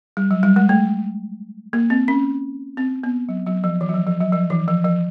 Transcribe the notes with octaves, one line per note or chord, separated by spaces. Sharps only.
G3
F#3
G3
G#3
A3
A#3
C4
C#4
C4
B3
F#3
F#3
F3
E3
F#3
F3
F3
F#3
F3
E3
F3
F3